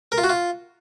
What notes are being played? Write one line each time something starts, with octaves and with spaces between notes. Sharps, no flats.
A#4
F4
F#4
F4